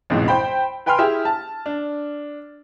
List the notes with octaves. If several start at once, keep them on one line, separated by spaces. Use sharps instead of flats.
A1 F2 G#2 B2 E3
C5 G5 B5
B4 G5 G#5 B5 C6 F6
E4 G4 G#4 E5
A5
D4